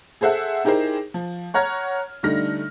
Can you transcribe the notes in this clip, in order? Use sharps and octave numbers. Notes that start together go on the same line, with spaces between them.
G#4 A4 C5 E5 F#5
D#4 E4 G4 G#4 A#4 C5
F3
C#5 F#5 A#5 F6 G#6
D3 G3 A3 D#4 F6 A#6